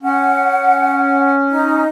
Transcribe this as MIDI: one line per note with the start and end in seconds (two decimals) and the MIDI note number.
0.03 1.84 61
0.03 1.33 78
1.50 1.88 63